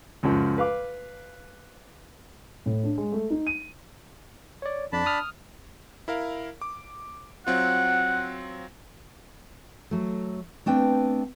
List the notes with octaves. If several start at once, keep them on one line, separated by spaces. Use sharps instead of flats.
C#2 F#2 F3
B4 F5 D6
A2
D4
G#3
A3
D#4
D#7
C#5 D5
F2 D4 A5 B5
D#6 F6
E4 A#4 F5
D6
F#3 C4 F4 F#5
F#3 A3
A3 B3 C4 D4 B4 G5